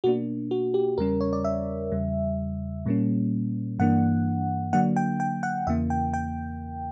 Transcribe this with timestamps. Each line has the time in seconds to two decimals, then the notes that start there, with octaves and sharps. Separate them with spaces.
0.04 B2 A#3 D4 F#4
0.51 F#4
0.74 G4
0.98 E2 C#3 G3 C#4 A#4
1.21 C#5
1.33 D5
1.44 E5
1.92 E2 C#3 G3
2.86 A#2 G3 A#3 C#4
3.79 G2 E3 A#3 D4 F#5
4.73 D3 F#3 A#3 D4 F#5
4.96 G5
5.20 G5
5.43 F#5
5.67 E2 C#3 E3 A#3 E5
5.90 G5
6.13 G5